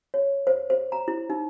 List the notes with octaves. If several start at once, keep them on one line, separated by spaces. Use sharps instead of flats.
C#5
C5
C5
A#5
E4
D#4